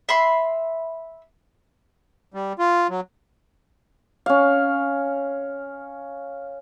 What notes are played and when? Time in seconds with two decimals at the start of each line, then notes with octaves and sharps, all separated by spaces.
0.09 E5 B5 C6
2.34 G3
2.59 F4
2.89 F#3
4.26 C#4 F5